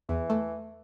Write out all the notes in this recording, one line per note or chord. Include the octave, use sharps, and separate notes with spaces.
E2 E3
A3